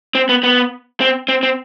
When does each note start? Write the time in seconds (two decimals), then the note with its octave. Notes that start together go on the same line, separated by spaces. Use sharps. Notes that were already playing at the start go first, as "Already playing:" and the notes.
0.15 C4
0.29 B3
0.43 B3
1.01 C4
1.28 C4
1.43 C4